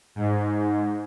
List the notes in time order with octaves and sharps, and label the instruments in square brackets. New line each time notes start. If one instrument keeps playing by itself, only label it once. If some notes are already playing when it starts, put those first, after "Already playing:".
[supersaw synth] G#2